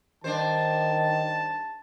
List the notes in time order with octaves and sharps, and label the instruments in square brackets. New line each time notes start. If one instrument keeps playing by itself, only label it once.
[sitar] G2 D4 C5 [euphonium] D#3 [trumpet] A5